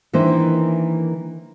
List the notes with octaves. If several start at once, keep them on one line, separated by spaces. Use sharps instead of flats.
D#3 E3 A#3 D4 C5